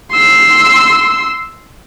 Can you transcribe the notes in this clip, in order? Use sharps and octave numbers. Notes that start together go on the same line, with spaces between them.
C6 E6